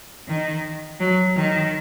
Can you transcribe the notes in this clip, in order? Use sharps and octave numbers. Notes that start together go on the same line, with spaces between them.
D#3
F#3
D#3